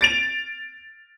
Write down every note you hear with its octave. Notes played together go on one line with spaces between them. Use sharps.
A6 D7 F7